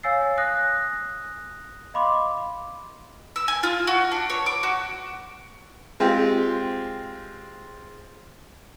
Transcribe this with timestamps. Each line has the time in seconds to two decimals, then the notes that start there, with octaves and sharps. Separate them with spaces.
0.03 C#5 F5 G#5 E6 A6 C7
0.38 D#6 F#6 A#6
1.94 D#5 F5 B5 C6 D6
3.36 E6
3.48 G#5
3.63 F4
3.87 F#4
4.12 D4
4.30 C#5
4.46 D6
4.63 F#4
6.00 G#3 C4 F4 G4